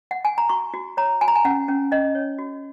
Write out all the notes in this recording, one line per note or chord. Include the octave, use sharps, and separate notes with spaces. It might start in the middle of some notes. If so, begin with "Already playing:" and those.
F#5
G#5
A#5
F#4 C#6
F#4
C#5 A#5
F#4 G#5
A#5
G#5
C#4 F#5
C#4
C#4 D#5
C#5
F#4